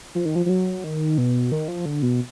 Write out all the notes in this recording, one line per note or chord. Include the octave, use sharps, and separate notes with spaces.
F3
D#3
F3
F3
F#3
D#3
B2
D#3
F3
D3
B2